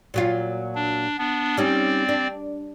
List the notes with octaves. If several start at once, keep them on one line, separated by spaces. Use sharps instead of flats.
A#2 F#3 F4
D4
B3 D4
G3 C4 C#4 D#4 D5
D4